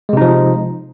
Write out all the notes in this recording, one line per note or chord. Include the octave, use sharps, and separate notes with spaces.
C3 F3 G#3 D#4